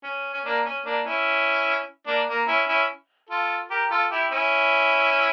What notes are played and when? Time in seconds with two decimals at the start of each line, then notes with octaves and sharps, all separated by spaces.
0.04 C#4
0.34 C#4
0.46 A#3 D4
0.66 C#4
0.85 A#3 D4
1.06 C#4 E4
2.07 A#3 D4
2.28 A#3
2.48 C#4 E4
2.68 C#4 E4
3.29 F4 A4
3.70 G4 A#4
3.90 F4 A4
4.11 E4 G4
4.32 C#4 E4